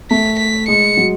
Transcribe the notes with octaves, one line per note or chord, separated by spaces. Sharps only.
A3 B6
B6
G#3 C#7
F#3